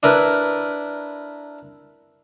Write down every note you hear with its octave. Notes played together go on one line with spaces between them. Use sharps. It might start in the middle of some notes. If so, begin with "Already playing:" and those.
D4 E4 A#4 B4